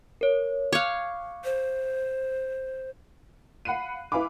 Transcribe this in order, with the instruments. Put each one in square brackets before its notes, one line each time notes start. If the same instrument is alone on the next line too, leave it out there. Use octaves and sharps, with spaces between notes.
[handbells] A#4 C#5
[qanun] C#5 F5 [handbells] D6 F#6
[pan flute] C5
[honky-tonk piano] F5 F#5 B5 F#6 C7 D#7
E4 B4 F5 G#5 B5 D6